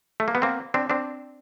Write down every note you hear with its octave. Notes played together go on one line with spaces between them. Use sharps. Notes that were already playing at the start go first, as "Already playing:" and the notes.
A3
A#3
B3
A#3 C4
C4 D4
C4 D4